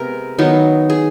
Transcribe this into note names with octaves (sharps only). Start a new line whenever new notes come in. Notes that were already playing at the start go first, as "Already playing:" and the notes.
Already playing: C3 G#3 B3 A#4
D#3 F#3 B3 D#4
G#4